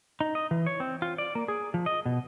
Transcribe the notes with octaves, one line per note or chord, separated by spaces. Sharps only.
D#4
D#5
E3
C#5
C4
F4
D5
A#3
G#4
F3
D#5
B2